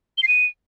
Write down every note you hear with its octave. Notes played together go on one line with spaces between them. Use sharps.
G7
C7
D#7